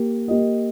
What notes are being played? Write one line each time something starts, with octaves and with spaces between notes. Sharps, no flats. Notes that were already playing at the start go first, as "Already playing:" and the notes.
Already playing: A#3 G4
A#3 G4 D#5